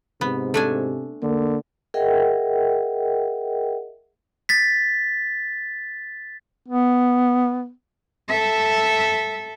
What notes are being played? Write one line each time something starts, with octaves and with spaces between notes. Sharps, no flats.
G#2 C3 B3
A3 D4 G#5
D3 A#3
G#4 A#4 D#5 E5 F#5 G5
A6 B6
B3
A4 E5